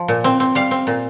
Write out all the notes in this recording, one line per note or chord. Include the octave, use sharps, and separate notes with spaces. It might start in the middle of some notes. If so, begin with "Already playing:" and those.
Already playing: F3
A#2
C4
C4
G3 F5
C4
A#2